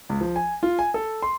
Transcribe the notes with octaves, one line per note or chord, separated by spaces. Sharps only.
C#2
F3
G#5
F4
G#5
A4
C6